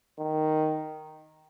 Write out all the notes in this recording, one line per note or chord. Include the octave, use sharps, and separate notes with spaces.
D#3